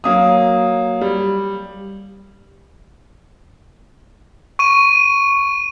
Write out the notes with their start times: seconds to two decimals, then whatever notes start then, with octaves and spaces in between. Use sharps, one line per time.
0.04 F#3 A#3 D#6
1.01 G3
4.59 C#6 D#7